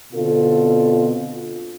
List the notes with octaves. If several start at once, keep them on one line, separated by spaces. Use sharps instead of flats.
B2 D3 C4 F4 A4